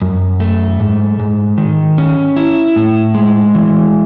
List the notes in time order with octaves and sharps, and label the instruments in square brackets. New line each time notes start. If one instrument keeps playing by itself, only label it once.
[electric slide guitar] F#2
A3
G#2
G#2
D#3
C#4
E4
A2
G#3
E3